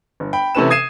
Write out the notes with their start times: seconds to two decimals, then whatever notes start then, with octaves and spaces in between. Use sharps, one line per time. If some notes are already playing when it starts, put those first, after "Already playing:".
0.20 G1
0.33 G5 B5
0.55 C3 E3 C#4 A4 B4 E7
0.70 D#6 G#6 C7 D#7 E7